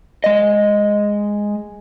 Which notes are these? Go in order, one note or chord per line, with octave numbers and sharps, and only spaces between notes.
G#3 D#5